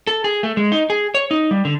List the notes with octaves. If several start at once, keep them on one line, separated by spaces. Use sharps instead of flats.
A4
G#4
A3
G#3
D#4
G#4
C#5
D#4
G3
D3